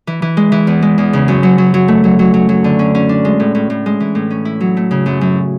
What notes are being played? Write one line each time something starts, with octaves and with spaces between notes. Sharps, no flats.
E3
E3
G#3
E3
E2
G#3
E2
C#3
F#2
F#3
F#3
F#3
A3
F#3
F#3
F#3
F#3
D3
C#4
C#4
D4
G#3
A2
A2
A2
G#3
E3
A2
C#4
E4
F#3
A3
C#3
F#2
F#2